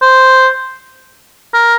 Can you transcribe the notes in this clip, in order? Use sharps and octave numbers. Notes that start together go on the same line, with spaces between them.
C5
A#4